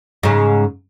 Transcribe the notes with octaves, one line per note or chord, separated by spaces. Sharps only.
G#2 C#3